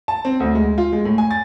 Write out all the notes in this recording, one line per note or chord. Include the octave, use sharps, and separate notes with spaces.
A5
C4
D2
G#3
F4
G#3
A2
G#5
A6